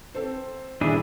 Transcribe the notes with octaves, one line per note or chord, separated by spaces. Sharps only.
C4 A4 C5
D#1 D4 E4 G#4